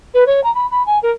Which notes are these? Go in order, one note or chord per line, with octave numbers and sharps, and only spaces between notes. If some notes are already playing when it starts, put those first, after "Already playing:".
B4
C#5
A#5
B5
B5
G#5
A#4